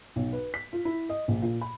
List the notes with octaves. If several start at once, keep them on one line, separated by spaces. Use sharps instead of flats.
B1
B4
B6
F4
E4
D#5
A#1
A#2
B5